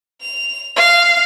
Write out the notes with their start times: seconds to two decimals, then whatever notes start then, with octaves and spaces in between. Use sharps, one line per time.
0.21 F7
0.76 F5